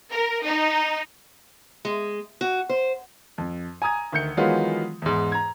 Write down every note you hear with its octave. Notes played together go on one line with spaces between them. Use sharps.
A#4
D#4
G#3
F#4
C5
F2
G#5 A#5 D#6 G#6
D2 D#3 G6 C#7
D#3 E3 F#3 G#3 B3 F4
E2 G#2
A#5 G#6